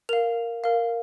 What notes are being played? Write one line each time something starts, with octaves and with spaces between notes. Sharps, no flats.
A#4 F5 F7
A#4 F5